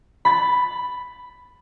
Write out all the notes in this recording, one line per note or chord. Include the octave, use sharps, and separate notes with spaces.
B5 A6